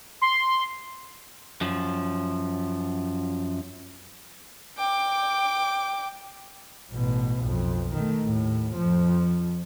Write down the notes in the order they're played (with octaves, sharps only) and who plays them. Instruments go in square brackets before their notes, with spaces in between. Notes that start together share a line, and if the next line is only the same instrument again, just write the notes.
[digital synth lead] C6
[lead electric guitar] F#2 F3
[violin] G5 D6
[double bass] A1 B2
B1 F2
D#3 A3
D#2 A2
F2 F3